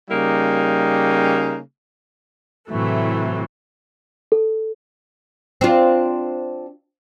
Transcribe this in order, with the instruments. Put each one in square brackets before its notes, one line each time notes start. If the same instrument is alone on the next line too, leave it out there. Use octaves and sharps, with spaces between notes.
[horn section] C#3 G3 A#3 D#4
[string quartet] A2 C3 E3 F#3 A3
[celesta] A4
[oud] C4 D4 F4